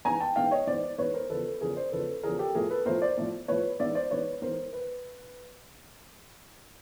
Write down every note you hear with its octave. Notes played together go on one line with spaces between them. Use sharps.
G#2 E3 G#5 A#5
G5 A5
G#2 E3 F5 G5
C#5 D#5
G#2 E3 C5 D5
G#2 E3 B4 C#5
A#4 C5
E2 C#3 F3 A4 B4
E2 C#3 F3 G#4 A#4
C5 D5
E2 C#3 F3 A4 B4
E2 C#3 F3 G#4 A#4
G4 A4
A2 F3 G#4 A#4
A4 B4
A2 F3 A#4 C5
C5 D5
A2 F3
A2 F3 B4 C#5
G#2 E3 D5 E5
C5 D5
G#2 E3 B4 C#5
G#2 E3 A#4 C5
B4